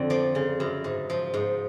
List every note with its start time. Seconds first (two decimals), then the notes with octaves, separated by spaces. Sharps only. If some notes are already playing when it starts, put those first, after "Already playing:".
Already playing: F2 D3
0.10 F3 D5
0.35 C#3
0.60 F#2
0.84 G#2
1.10 F3
1.34 G#2